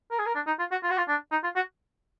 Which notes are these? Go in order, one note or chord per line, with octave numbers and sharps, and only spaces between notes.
A#4
G#4
A#4
D4
D#4
F4
F#4
F4
F#4
F4
D4
D#4
F4
F#4